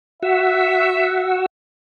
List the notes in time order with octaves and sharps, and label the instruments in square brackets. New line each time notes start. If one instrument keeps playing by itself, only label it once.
[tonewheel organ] F#4 F#5 E6 [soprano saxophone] E5